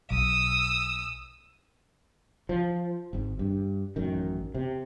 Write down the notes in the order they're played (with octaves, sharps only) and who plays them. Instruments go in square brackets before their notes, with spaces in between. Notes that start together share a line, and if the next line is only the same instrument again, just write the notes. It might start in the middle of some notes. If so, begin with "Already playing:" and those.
[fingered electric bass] B1 [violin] D#6 E6
[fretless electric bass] F3
G#1 G#2
G2
A1 F#2 D#3
C3